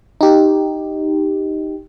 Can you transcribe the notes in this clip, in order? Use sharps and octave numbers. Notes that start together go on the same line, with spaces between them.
D#4 G4